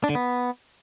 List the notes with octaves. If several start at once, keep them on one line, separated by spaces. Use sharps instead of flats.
D4
D3
B3